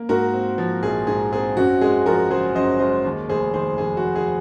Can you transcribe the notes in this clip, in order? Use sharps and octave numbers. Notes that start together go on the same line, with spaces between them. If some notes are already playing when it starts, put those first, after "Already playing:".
Already playing: A#3
G#2 F#4 A#4
C4
F3
A#1 G#4
G#2 G#4
C4 G#4
F#2 F#4
G#3 G#4
F3 F#4 A#4
F#1 G#4 C5
F#2 C5 D#5
G#3 C5 D#5
D#2
F1 G#4 C5
D#3 G#4 C5
F1 G#4
F#4
D#2
G#4